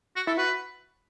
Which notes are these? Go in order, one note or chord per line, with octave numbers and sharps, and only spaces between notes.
F#4
E4 A4
F#4 B4